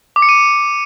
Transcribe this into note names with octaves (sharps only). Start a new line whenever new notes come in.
D6
C#7
D#7